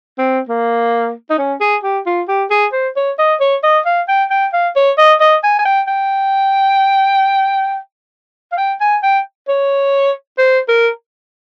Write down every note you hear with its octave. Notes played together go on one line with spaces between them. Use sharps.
C4
A#3
D#4
C#4
G#4
G4
F4
G4
G#4
C5
C#5
D#5
C#5
D#5
F5
G5
G5
F5
C#5
D#5
D#5
G#5
G#5
G5
G5
F5
G5
G#5
G5
C#5
C5
A#4